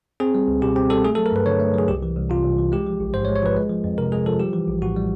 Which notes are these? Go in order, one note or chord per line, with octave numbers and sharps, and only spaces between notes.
C4 G#4
G3
C#2
B2 G4
C4 G4
G3 A4
A3 G#4
A4
F#3
A#4
G2 B4
D3 C#5
A3
F#3 G#4
C2 G4
E3
C2
C3 F4
C2
E3
G#3 G4
F3
A1
G#2 C5
C#5
G#3
C#5
F3 B4
G#3
F3
F2
C3 A#4
G#3 G#4
F3 A4
G3 G4
E3
A#1
A2 F#4
G3